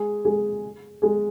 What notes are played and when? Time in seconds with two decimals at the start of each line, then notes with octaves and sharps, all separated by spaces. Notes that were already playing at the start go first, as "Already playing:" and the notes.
Already playing: G#3 G#4
0.25 G#3 G#4
1.02 G#3 G#4